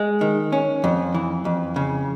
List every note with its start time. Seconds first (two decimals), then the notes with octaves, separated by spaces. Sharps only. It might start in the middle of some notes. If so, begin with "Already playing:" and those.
Already playing: G#3
0.21 D#3
0.52 C#4
0.84 F2
1.14 E3
1.45 F2
1.76 C#3